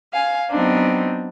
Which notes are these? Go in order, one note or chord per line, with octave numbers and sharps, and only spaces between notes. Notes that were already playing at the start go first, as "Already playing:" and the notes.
F5 G#5
F#3 B3 C4 D4 D#4